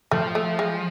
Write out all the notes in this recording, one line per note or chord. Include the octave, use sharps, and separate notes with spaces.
F3 A3
A3
G#3